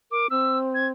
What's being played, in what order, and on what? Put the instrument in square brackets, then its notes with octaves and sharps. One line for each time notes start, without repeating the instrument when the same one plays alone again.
[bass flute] A#4 [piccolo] D6
[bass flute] C4 [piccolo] E6
[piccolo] G#6